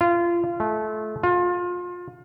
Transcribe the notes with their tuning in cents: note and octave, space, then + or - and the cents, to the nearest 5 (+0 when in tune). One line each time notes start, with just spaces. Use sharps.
F4 -25
A3 -25
F4 +25